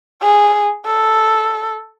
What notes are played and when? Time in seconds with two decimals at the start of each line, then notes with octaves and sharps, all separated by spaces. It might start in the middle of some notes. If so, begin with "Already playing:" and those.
0.22 G#4
0.86 A4